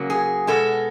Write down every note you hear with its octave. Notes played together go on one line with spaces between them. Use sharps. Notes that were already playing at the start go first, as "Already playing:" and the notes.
Already playing: C#3 F#3 A#3
G#4
B2 G#3 B3 A4